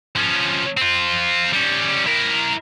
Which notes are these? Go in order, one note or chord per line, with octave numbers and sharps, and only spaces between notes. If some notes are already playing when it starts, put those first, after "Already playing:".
F3 C#4
C4 F4
G3 C#4
E4 A#4